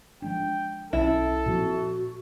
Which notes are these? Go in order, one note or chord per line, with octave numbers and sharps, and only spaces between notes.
F3 G#3 D4 G5
B1 C#4 E4 A4
A#2 F3 C4 F#4